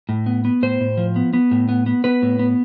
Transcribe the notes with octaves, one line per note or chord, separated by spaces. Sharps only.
A2
B3
B3
A2 C5
A2
F3
B3
B3
A2
B3
B3
B3 B4
A2
B3